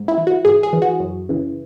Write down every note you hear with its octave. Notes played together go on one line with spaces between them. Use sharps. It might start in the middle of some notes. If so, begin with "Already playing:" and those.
Already playing: G#2
E4
E3
F#4
G#2 G#4
G#4
E3
F#4
F#2
C#3 E3